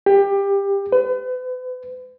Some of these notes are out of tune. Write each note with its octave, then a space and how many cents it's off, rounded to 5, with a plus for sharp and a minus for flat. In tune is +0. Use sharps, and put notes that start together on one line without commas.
G4 +20
B4 +40